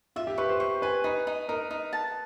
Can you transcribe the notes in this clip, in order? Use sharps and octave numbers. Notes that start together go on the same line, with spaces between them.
F4 E5
G4
B4 C#6
C5
C5 C#6
B4 G#5
D#4 B4
D#4
D#4 A#4
D#4
A5